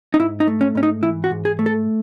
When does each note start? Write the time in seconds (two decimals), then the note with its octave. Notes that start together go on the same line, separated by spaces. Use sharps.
0.14 D#4
0.19 G#2 E4
0.40 D#4
0.47 A3
0.61 C#4
0.75 G#2 C#4
0.83 D#4
1.03 E3 E4
1.24 F#4
1.31 G#2
1.45 G#4
1.59 A3
1.66 A4